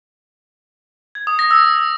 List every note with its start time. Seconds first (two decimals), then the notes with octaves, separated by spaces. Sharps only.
1.15 G#6
1.27 D#6
1.39 A#6
1.51 E6